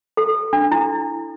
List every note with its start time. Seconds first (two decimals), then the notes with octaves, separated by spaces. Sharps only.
0.17 A4
0.53 D4
0.72 E4